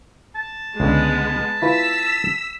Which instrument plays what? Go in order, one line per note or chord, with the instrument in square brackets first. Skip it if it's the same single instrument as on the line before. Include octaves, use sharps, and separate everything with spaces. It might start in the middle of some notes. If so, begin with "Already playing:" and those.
[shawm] A5
[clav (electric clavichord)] C#2 D3 [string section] G#3 B3
[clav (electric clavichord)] E4 F4 B4 [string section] E6 B6